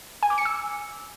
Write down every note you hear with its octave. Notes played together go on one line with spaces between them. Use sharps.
G#5
D6
C#7
E6